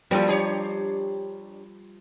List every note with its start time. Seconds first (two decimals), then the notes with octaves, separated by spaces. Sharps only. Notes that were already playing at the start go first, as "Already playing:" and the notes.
0.11 F3 G3 A3 G4 A4
0.27 D4 G4 C#5